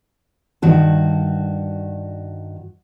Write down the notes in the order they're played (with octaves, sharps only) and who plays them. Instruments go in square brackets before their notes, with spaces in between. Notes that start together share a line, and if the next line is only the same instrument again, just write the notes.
[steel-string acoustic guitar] G2 D#3 F#4 A5